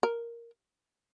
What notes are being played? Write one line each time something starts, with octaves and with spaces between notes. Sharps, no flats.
A#4